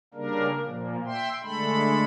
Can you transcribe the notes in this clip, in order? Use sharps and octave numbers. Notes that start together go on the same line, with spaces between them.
C#3 G3 A#3 D4 A#4
A#2 F3 A#3
E5 G5 C6
D3 G#3 A3 A4 B5